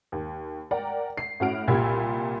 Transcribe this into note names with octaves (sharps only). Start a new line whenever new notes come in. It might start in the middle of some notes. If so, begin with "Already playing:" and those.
D#2
A#4 D5 F#5 G5 A#5
C7
A2 C#4 F#4 F#5 F6 D7
C2 A#2 G4 B5 E6 G#6